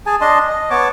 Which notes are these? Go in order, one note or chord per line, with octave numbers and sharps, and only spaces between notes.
G#4 G#5 A5
D4 D#5 A5 C6
D#5
B3 C#5 A5 D6